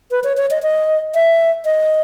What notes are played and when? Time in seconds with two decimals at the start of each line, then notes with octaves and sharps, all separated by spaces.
0.11 B4
0.24 C#5
0.37 C#5
0.51 D#5
0.63 D#5
1.15 E5
1.65 D#5